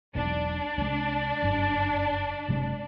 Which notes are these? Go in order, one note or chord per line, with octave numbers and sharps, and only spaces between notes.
E1 B1 D4 D5
C2 G#3
F#1 G2
F#1 C3 G#3